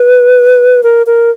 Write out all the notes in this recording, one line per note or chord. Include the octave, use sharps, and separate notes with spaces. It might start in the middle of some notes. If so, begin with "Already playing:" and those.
Already playing: B4
A#4
A#4